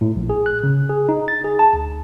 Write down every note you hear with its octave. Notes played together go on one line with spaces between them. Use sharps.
A2
A#1
G#4
F#6
C#3
G#4
D#4
A6
G#4
A5
D2